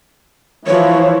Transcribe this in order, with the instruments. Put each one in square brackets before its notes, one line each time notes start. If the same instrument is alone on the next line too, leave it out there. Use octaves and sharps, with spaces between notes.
[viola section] E3 F3 [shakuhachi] C#5